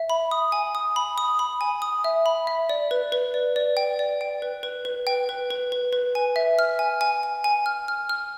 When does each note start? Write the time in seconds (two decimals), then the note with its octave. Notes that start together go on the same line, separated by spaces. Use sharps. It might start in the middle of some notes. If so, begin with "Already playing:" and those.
Already playing: E5
0.10 B5
0.31 D#6
0.52 G#5
0.75 D#6
0.96 B5
1.18 D#6
1.39 B5
1.61 G#5
1.82 D#6
2.04 E5
2.26 B5
2.47 E5
2.70 D5
2.91 B4
3.12 B4
3.34 D5
3.56 D5
3.77 G5
3.99 D5
4.21 G5
4.42 B4
4.63 B4
4.85 B4
5.07 G5
5.29 B4
5.51 B4
5.72 B4
5.93 B4
6.15 G#5
6.36 E5
6.59 F6
6.79 G#5
7.01 G#5
7.23 G#5
7.44 G#5
7.66 F6
7.88 F6
8.09 F6